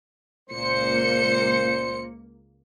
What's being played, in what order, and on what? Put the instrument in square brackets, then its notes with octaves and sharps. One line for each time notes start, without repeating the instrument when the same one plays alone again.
[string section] C#2 A#3 C#7 [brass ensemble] A#2 C5